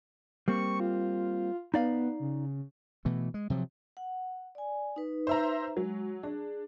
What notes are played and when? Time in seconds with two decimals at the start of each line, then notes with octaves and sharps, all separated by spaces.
0.48 G3 A#3 C4 C#6
0.80 F4
1.74 B3 D#4 D5 F5
2.20 C#3
3.05 B2 E3 A3
3.34 G#3
3.50 C3 F3 F#3
3.97 F#5
4.55 D5 G#5
4.96 D#4 B4
5.27 C5 E5 A#5
5.77 F#3 G#3
6.23 D4 G#4